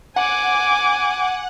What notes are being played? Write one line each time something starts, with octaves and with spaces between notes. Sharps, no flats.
F#5 G#5 D6